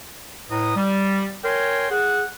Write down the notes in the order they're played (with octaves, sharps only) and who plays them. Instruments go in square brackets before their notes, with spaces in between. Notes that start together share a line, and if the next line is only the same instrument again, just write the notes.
[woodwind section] A2 B4 D#5 A#5 D#6
G3
A#4 C#5 G5 G#5 C6
G#4 F#5